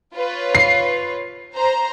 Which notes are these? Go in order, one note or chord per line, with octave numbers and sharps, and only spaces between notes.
F4 B4 C#5
C7
C5 A#5